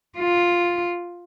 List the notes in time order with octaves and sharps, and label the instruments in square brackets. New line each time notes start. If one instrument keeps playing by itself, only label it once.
[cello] F4